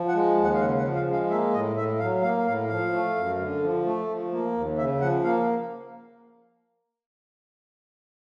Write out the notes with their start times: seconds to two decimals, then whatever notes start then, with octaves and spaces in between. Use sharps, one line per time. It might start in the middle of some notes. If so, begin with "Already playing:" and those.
Already playing: F3
0.08 F#5
0.14 G#3
0.38 D#2
0.43 F#5
0.54 F5
0.60 C#3 F#5
0.78 F#5
0.84 F3
0.95 F5
1.07 G#3
1.13 F5
1.30 A#3 E5
1.53 A2 D#5
1.76 A2 E5
1.99 F#3 F5
2.23 A#3 F5
2.46 A2 F5
2.69 F3 F5
2.93 A3
3.16 F#2
3.38 D3
3.62 F3
3.85 A3
4.09 F3
4.32 A#3
4.54 D#2
4.78 C#3 E5
5.00 F3 F#5
5.24 A#3 F5